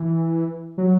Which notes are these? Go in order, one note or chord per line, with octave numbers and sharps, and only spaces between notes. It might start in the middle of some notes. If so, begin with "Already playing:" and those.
Already playing: E3
F#3